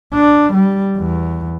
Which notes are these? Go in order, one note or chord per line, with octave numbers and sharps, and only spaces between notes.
D4
G3
E2